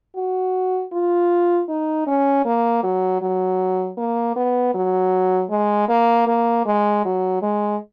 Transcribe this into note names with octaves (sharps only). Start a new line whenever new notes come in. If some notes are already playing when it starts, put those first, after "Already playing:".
F#4
F4
D#4
C#4
A#3
F#3
F#3
A#3
B3
F#3
G#3
A#3
A#3
G#3
F#3
G#3